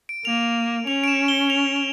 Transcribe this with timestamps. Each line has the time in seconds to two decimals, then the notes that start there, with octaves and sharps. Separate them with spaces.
0.09 D7
0.25 A#3 F7
0.87 C#4 F7
1.04 D7
1.08 E7
1.28 G7
1.50 F7
1.76 F7